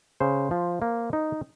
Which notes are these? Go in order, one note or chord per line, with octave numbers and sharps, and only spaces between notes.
C#3 C5
F3
A#3
D#4